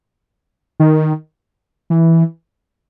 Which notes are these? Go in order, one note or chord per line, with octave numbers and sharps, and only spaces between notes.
D#3
E3